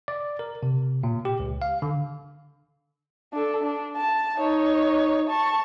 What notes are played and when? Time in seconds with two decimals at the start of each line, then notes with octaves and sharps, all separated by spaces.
0.08 D5
0.39 A#4
0.63 C3
1.03 A#2
1.25 G4
1.40 C#2
1.62 F5
1.82 D3
3.33 D4 A4
3.63 D4
3.96 A5
4.38 D#4 C#5
5.29 A5 C#6